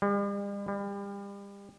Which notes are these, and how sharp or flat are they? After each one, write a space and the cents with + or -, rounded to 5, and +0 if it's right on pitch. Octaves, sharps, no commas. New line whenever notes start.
G3 +45
G3 +35